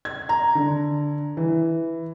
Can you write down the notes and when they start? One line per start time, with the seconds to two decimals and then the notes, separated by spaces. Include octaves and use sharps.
0.05 G#6
0.29 A#5
0.55 D3
1.37 E3